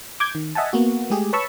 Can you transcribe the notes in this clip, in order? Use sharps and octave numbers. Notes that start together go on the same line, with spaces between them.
D6 G6 G#6
D#3
D#5 E5 F#5 G#5 A5
A#3 B3 F#4
G#3 A3 G4 G#4
B4 C#5 A5 B5 C#6 E6